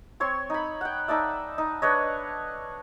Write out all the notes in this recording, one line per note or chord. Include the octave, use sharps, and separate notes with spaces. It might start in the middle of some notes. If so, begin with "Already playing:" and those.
C4 C#5 C6
D#4 B5
F#5 G5
D#4 A4 D5 E5
D#4
D4 B4 C#5 D#5